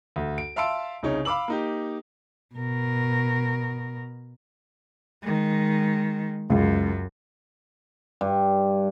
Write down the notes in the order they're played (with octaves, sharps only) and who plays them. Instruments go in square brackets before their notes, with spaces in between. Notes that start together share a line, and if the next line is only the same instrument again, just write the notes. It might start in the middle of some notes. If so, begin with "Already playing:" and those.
[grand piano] D2
D7
E5 F5 A5 C6 E6 D7
C2 C#3 D#4 C#5
F5 B5 D6 E6 F#7
A#3 D#4 G4
[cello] B2 A#4
D#3 G#3
[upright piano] C#2 [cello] F#2
[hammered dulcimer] G2